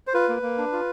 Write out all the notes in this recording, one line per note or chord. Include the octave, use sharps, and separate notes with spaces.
C5
F4 B4
A#3
A#3
D4
F4